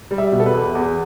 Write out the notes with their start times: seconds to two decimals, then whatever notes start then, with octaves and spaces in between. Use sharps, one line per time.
0.11 G3
0.18 E5
0.32 B2
0.40 A4
0.46 B4
0.53 E2
0.75 E2